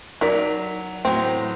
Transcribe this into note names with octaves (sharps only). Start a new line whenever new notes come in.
F#3 D#4 A#4 D5 B6
A2 E3 F#3 C4